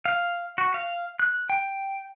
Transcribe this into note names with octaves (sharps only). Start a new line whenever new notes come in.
F5
F#4
F5
F#6
G5